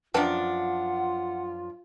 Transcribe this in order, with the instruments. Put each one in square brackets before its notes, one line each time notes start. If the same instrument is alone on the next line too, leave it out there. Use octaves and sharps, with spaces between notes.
[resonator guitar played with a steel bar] F#2 F3 D4 [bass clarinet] F4 [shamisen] B4 G5 A5 [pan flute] F#5